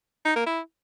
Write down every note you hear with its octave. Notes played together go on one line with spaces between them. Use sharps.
D#4
A#3
E4